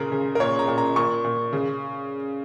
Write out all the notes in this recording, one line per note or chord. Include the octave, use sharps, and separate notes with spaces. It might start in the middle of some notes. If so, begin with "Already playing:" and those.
Already playing: A#2 C#3 A#4
C#3
A#4
A#2 C#5
A#5
A#2
A#5
A#2 C#6
A#2
C#3